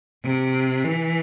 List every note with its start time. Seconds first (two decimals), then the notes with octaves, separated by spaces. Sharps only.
0.25 C3
0.84 E3